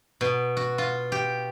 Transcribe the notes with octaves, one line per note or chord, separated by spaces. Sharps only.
B2
F#4
F4
G4